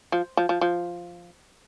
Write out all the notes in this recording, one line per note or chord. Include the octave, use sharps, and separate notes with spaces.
F3
F3
F3
F3